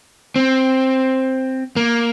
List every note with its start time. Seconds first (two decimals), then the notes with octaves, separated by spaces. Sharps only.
0.36 C4
1.76 A#3